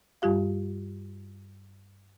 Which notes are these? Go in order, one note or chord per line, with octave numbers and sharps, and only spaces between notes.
G2 G3 F4 G4 F5